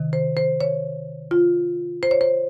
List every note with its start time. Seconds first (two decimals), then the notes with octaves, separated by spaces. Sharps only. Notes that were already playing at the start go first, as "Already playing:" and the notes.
Already playing: C3 D#3
0.13 C5
0.37 C5
0.61 C#5
1.31 F4
2.03 C5
2.11 C#5
2.21 C5